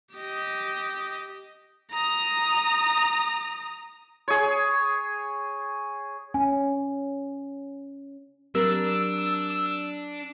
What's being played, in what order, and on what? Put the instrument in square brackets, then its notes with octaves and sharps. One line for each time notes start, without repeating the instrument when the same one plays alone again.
[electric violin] G4 D#5
A#5 D#6
[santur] G#4 C#5
[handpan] C#4 [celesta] G#5
[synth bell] F#3 C4 G4 [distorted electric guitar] D4 [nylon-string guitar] A#4 [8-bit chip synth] E6